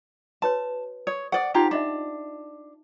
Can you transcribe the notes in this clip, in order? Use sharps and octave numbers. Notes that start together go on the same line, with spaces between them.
F#4 B4 C#5 A5
C#5 D#6
G#4 C5 D5 F#5 D#6
D4 D#4 F4 G4 F#5 A#5
D4 F4 D#5 E5